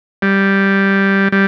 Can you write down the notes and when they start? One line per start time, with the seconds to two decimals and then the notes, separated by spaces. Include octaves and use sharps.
0.22 G3
1.32 G3